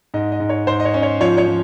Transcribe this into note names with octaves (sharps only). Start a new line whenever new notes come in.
G#2 D#5
D#5
G#2
C#5
G#2 C5
D#5
C#5
C#4
C#5
F3 C#5
C#5
F3